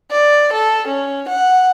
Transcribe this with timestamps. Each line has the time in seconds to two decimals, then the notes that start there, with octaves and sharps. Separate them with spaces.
0.12 D5
0.52 A4
0.87 C#4
1.28 F#5